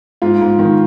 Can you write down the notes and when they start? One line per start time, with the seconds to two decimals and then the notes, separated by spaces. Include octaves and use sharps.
0.22 G#2 F4
0.41 G#2
0.59 D#3